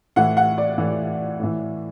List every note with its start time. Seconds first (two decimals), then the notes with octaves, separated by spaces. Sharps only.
0.16 A2 E3 F#5
0.37 F#5
0.58 D5
0.78 A2 E3
1.40 A2 E3